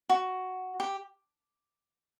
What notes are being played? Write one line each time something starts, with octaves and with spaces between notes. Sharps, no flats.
F#4
G4